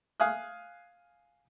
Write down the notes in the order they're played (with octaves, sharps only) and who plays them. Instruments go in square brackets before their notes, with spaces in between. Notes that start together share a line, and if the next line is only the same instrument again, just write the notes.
[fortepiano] F5 G#5 D#6 F#6